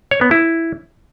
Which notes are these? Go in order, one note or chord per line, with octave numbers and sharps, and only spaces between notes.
C#5
B3
E4